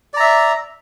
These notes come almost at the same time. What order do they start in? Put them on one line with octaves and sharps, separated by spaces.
D5 A#5 E5